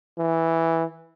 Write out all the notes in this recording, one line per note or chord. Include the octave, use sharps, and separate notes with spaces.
E3